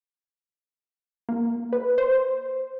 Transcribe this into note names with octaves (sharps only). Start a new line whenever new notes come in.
A#3
B4
C5